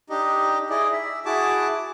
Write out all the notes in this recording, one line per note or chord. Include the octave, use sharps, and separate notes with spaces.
D4 D#4 G4 D#5
E4 G#4 D5 D#5
E5
E4 F#4 G#4 A5 D6